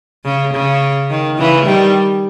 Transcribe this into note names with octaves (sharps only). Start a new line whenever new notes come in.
C#3
C#3
D#3
C#3 E3
D#3 G3